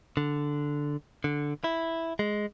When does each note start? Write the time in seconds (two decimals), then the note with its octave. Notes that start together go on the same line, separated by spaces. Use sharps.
0.17 D3
1.24 D3
1.64 E4
2.19 G#3